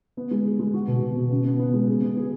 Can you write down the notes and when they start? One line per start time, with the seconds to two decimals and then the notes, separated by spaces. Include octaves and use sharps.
0.17 B3
0.31 G#3
0.45 G#4
0.59 G#3
0.74 F#4
0.88 B2
1.02 B2
1.16 B2
1.31 C#3
1.44 B3
1.59 B3
1.74 G#3
1.88 G#4
2.02 B3
2.17 G#4